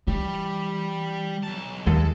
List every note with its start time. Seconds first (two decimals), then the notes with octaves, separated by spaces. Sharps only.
0.07 E3 G3
1.43 B1 A5
1.86 D#2 G#3 A4